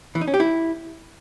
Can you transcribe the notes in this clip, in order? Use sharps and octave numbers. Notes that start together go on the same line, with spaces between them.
E3
D#4
C#4
G4
E4